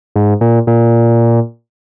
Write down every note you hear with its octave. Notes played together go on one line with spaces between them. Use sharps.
G#2
A#2
A#2